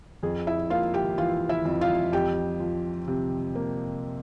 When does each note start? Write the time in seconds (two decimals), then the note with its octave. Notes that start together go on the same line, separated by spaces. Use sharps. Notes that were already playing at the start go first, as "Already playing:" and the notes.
0.23 F2 G#4
0.47 E4 E5
0.70 A#3 F4 F5
0.94 G4 G5
1.18 E3 F4 F5
1.49 E4 E5
1.65 F2
1.81 F4 F5
2.12 F2 G4 G5
2.60 F3
3.08 C3
3.55 A#3